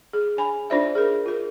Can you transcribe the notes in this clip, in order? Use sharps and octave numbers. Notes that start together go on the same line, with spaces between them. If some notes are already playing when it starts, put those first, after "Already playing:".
G#4
D4 C#5 G#5 B5
D4 D#4 F4 C5 D5 E5
G#4 A#4
F4 A#4